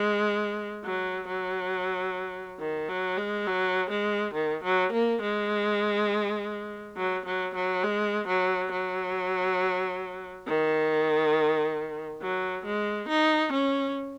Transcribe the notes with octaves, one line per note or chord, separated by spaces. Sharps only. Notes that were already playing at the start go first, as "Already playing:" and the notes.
Already playing: G#3
F#3
F#3
D#3
F#3
G#3
F#3
G#3
D#3
F#3
A#3
G#3
F#3
F#3
F#3
G#3
F#3
F#3
D#3
F#3
G#3
D#4
C#4